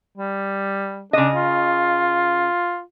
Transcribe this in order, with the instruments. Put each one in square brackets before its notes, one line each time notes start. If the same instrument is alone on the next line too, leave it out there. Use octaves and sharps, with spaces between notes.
[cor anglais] G3
[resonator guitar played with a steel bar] C#3 D#5 [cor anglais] D4
[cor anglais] F4